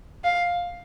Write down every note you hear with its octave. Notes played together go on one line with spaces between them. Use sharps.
F5